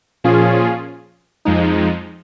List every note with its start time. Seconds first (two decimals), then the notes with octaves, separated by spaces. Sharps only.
0.24 A#2 F3 C#4 F4 G#4
1.45 F2 F3 G#3 D#4